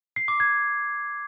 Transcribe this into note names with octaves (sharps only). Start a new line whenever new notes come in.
C7
D6
G#6